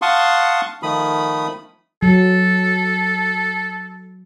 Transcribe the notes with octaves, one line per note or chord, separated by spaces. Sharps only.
F5 F#5 A5 C6 C#6 D#6
D#3 F3 A3 B5 D#6
F#3 A4